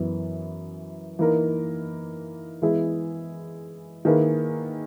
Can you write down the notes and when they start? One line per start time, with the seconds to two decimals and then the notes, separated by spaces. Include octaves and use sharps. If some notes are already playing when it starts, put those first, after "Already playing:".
Already playing: F#2 E3 B3
1.19 E3 A#3 D#4 A#4
2.62 E3 G#3 B3 E4 G#4
4.05 D#3 A#3 E4 G#4 B4